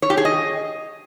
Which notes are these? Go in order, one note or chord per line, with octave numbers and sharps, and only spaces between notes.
C#5
G4
G#4
D#5